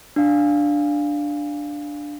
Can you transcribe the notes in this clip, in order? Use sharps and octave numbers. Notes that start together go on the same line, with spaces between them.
D4 F5